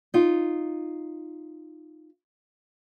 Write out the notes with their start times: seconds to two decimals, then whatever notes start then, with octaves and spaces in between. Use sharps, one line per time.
0.14 D#4 F4